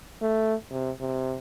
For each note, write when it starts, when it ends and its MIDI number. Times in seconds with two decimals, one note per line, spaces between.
0.22 0.54 57
0.71 0.91 48
1.01 1.37 48